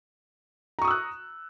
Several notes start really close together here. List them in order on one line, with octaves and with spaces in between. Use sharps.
A#5 C#6 D#6 E6 F#6